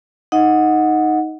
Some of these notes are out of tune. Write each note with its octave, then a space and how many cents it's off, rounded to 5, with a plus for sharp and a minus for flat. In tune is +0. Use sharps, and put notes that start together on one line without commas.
D#4 +0 D#5 +15 F#5 -10